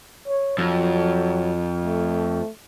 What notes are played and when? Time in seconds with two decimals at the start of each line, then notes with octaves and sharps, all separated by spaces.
0.28 C#5
0.58 F2 F#3
1.83 A3